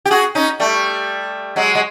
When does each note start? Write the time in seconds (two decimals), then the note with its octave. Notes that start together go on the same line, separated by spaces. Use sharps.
0.05 G4
0.11 F#4 G#4
0.35 C#4 D#4
0.60 G3 A3
1.56 F#3 G#3
1.75 G#3